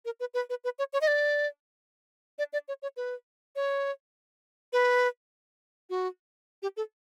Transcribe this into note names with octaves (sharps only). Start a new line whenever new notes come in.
A#4
B4
B4
B4
B4
C#5
C#5
D#5
D5
D5
D5
C#5
C#5
B4
C#5
B4
F#4
G4
A4